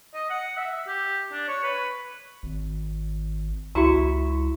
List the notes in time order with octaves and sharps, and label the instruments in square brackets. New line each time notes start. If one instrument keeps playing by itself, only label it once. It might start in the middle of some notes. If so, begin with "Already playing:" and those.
[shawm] D#5
F#5
E5
G4
D4
C#5
B4
[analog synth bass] G#1
[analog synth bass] C#2 [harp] E4 C#6 C#7 [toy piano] F#4 A#5